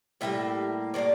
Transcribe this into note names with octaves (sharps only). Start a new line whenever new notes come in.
A2 G3 A#3 E5
A2 G3 A#3 D5